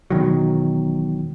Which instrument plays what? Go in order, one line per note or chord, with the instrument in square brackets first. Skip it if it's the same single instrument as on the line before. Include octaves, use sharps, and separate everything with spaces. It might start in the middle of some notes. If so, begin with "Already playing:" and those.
[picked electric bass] E1 B2 D#3 F#3